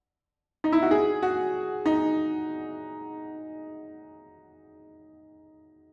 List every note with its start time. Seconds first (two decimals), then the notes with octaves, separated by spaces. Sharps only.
0.64 D#4
0.72 E4
0.82 F#4
0.91 G#4
1.22 F#4
1.86 D#4